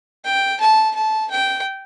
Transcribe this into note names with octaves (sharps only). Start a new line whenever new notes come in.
G5
A5
A5
G5